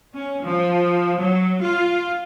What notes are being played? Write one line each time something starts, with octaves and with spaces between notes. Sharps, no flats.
C#4
F3
F#3
F4